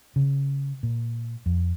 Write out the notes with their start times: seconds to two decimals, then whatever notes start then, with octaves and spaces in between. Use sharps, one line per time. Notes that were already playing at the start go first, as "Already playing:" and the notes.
0.16 C#3
0.83 A#2
1.46 F2